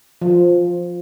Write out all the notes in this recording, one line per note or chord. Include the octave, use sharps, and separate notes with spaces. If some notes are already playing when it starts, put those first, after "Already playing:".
F3